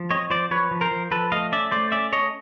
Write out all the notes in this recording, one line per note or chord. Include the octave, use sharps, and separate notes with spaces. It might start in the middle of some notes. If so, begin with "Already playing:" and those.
Already playing: F3
C4 C#5 D#5
F3 C5 D5
F3 B4 C#5
F3
A#4 C5
F3
F3 A4 B4
A3 D#5 F5
C#4 D5 E5
A3 C5 D5
C#4 D5 E5
A3 C#5 D#5